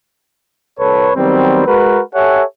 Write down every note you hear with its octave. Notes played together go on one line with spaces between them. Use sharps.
C2 A4 B4 C#5
D#3 F#3 G3 B3 C4
G#3 F#4 A#4 B4
G4 A4 C#5 E5 F#5 G#5